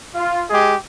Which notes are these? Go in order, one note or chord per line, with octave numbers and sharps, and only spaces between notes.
F4
G#3 G4 G#4 D#5